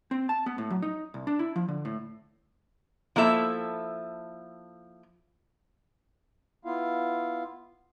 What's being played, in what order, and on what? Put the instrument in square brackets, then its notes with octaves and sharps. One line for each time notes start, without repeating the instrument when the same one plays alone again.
[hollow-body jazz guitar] C4
A5
B3
A2
F#3
D#4
C2
D4
E4
F3
D3
A2
[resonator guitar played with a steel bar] F3 A#3 E4 A4 E5
[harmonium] B3 E4 F4 F5